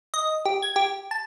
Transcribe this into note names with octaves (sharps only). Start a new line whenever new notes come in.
D#5
G4
G#6
G4
A5